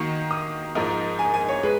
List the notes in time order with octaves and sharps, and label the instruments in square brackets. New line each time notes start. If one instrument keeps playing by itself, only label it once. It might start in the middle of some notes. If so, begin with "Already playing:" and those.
Already playing: [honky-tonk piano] D#3 A#3 D#4 F#4 [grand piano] C#6
[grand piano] D#6
[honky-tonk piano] G#2 F3 A#3 D#4 A#4
[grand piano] G#5
G#5
C#5
[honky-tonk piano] G#3 [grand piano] B4